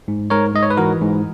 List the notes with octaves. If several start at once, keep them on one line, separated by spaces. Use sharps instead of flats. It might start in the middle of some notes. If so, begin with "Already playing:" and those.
G#2
G#2 A#4 C#5
G#2 D#5
C#5
B4
E3 F#4 A#4
G#2